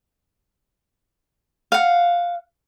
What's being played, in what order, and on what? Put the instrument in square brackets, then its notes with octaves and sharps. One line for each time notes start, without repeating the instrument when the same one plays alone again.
[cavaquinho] F5 F#5